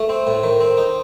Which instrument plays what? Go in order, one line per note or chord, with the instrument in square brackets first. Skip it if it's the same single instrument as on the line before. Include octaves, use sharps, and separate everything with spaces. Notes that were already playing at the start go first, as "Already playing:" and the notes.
Already playing: [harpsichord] A3
C4
A2
D#3
C4
D#4